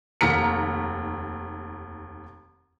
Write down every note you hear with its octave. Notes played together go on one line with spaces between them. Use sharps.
F1 D#2 A#5 F6 B6 C#7